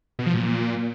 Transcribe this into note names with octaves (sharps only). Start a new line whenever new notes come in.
B2
F3
A#2